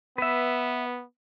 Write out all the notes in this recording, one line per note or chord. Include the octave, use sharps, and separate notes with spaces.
B3 B4 E5